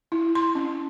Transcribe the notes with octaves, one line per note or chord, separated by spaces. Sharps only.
E4
C6
C#4